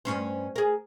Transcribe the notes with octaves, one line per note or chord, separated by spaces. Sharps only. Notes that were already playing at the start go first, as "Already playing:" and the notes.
G2 C#4 C5
G#4 A#4